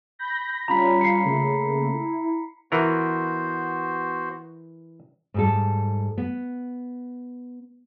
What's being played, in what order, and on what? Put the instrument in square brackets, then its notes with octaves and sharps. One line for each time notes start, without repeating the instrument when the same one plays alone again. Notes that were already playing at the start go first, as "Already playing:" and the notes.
[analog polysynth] B5 G6 A#6
[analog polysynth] G3 C#4 F4 [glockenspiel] A#5 B5 B6
[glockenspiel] C7 C#7
[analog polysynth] C#3 A3 A#3
E4
[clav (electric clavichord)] E3 A#4 [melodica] B3 F#4 C5
[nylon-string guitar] G#2 G3 A4
B3